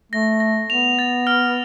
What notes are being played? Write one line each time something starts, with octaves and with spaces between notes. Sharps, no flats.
A3 A#6
A#6
B3 F7
A6
F6